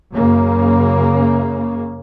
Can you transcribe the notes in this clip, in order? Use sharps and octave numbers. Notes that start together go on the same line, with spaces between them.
F#2 C#3 A#3